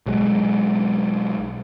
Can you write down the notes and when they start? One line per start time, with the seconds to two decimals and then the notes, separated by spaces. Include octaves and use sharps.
0.06 B1 F#3 G#3